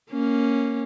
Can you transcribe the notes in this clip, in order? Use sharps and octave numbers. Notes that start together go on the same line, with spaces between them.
A#3 C#4